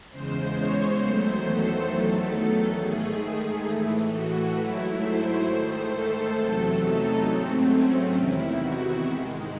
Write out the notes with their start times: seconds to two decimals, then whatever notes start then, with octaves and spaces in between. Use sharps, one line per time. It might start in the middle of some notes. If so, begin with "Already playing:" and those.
0.10 E2 C#3 G#3 C5
0.56 C#5
1.00 E2 D#3 F#3 A3 C5
1.45 A4
1.89 E2 D#3 F#3 A3 A4
2.33 A4
2.78 G#2 D#3 A3 G#4
3.67 A2 E3 A3
4.12 F#4
4.57 G#2 F#3 A3 E4
5.02 C5
5.46 G#2 D#3 A3 C5
5.91 A4
6.36 E2 C3 F#3 A3 A4
6.80 D#4
7.25 G#2 F#3 A3 C4
7.70 C#4
8.13 E2 C3 D#3 E4
8.59 F#4
9.03 G#2 D#3 G#3